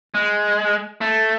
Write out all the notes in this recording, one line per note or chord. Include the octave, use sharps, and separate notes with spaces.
G#3
A3